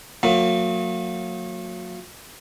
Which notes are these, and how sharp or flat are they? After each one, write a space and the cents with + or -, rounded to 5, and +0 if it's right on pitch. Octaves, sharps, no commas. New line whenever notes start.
F#3 -35 A#3 -40